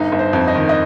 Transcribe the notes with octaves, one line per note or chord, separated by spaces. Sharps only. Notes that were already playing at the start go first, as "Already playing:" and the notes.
Already playing: G1 D#4
G1
C5
F2
D#5
D#3
D#5